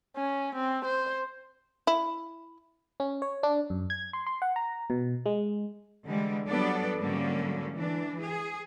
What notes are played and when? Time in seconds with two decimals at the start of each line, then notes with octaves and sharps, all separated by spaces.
0.16 C#4
0.55 C4
0.85 C5
1.87 E4
3.00 C#4
3.22 C#5
3.43 D4
3.70 F#2
3.90 G#6
4.13 C6
4.27 C6
4.42 F#5
4.56 A#5
4.90 B2
5.26 G#3
6.07 D3 E3 G3 G#3
6.48 F#3 G3 B3 D4 A4 D5
6.99 G#2 D3 F#3 G3 A#3 C#4
7.74 E3 D4
8.20 G#4